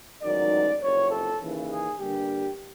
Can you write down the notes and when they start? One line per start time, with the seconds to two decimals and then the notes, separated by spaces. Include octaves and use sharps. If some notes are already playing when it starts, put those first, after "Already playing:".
0.22 A1 G#2 D#3 F#3 D5
0.81 F#1 F2 C3 C#5
1.11 A4
1.40 D#2 C#3 E3
1.69 G#4
1.99 G2 D3 G3 A#3 G4